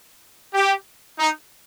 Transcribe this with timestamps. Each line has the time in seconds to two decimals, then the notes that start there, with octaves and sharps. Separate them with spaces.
0.54 G4
1.18 D#4